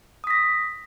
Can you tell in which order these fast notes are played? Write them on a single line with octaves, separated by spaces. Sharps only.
D#6 B6 A#6